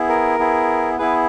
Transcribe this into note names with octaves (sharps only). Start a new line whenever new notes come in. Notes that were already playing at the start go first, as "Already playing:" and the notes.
Already playing: B3 E4 G#4
A#4
B3 E4 G#4
B3 E4 G#4 B4